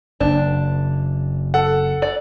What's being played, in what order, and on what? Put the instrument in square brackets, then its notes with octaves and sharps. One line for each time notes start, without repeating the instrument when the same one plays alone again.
[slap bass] F#1 [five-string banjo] D4
[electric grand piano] A4 F#5
[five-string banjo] D5